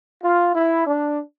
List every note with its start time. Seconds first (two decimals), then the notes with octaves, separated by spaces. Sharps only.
0.23 F4
0.54 E4
0.86 D4